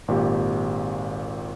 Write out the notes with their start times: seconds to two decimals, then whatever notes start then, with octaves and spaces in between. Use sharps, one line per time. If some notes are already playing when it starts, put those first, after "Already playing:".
0.08 G#1 A#2 G4